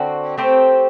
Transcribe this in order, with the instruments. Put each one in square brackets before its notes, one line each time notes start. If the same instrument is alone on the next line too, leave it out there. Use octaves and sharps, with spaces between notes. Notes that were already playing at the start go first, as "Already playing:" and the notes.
Already playing: [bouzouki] D3 C4 F#4
A3 C4 G4 C5